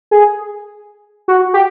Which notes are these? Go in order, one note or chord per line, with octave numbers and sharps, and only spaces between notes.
G#4
F#4
G4